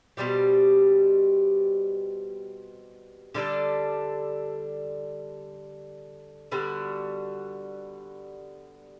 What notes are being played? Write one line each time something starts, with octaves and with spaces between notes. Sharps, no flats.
B2 G3 C4 G4
D3 G3 D4 A4
D3 G3 B3 F#4